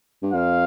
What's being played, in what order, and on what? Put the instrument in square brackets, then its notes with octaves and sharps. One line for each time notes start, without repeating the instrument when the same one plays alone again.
[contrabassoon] G2
[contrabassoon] F2 [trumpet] F5